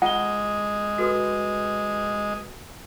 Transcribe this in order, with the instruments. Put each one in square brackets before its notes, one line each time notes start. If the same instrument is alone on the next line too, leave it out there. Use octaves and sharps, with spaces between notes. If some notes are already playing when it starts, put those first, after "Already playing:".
[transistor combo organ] G#3 D#5 [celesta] F4 G7 [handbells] F#5
[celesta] F#4 A4 B4